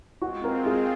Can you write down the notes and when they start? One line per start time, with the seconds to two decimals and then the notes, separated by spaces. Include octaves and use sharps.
0.22 G#3 C4 F4 F#4
0.44 A#4
0.66 G#4